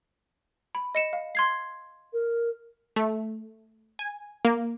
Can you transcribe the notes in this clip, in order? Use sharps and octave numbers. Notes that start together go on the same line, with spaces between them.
B5
D#5 C#7 E7
F5
C6 G#6 C7
A#4
A3
G#5
A#3